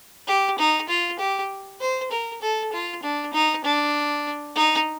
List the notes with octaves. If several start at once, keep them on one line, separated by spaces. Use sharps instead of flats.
G4
D#4
F4
G4
C5
A#4
A4
F4
D4
D#4
D4
D#4